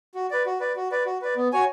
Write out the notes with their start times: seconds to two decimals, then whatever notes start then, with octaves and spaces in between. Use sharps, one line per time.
0.15 F#4
0.31 B4 D5
0.46 F#4
0.60 B4 D5
0.76 F#4
0.91 B4 D5
1.06 F#4
1.22 B4 D5
1.36 B3
1.52 F#4 C#5 G#5